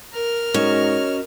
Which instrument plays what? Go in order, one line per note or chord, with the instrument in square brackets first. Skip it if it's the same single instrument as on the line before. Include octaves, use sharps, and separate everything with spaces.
[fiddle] A#4 F6
[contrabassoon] G#2 [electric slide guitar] C#4 F#4 D#5 [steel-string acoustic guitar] C#5